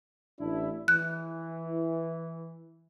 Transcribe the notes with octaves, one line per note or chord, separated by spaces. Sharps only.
A1 D4 E4
E3 F#6